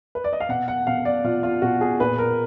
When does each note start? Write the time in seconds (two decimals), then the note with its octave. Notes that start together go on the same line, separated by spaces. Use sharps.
0.15 B4
0.24 D5
0.33 D#5
0.40 F5
0.49 B2 F#5
0.68 F#5
0.87 B2 F5
1.05 D5
1.24 B2 F4
1.43 F4
1.62 B2 F#4
1.81 G#4
2.00 A#2 B4
2.18 A#4